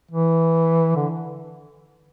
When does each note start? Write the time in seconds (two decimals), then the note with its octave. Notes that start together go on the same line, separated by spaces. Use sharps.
0.11 E3
0.96 D3